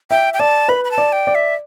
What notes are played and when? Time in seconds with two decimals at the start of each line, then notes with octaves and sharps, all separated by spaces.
0.11 E5 G5
0.34 G5
0.40 D5 A5
0.68 B4 B5
0.85 B5
0.91 A5
0.98 D5
1.12 G5
1.27 D5
1.35 E5